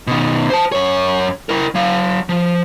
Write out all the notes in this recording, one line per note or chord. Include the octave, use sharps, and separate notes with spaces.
B2 D#3
C5 A5
F#2 C#5
E4 A#4
F#3 F5
F3